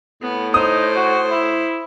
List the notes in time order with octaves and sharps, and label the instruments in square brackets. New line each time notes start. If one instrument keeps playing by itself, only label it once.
[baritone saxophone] A2 [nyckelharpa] B3
[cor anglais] D#4 [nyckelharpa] C5 [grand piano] D#6
[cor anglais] F#4
E4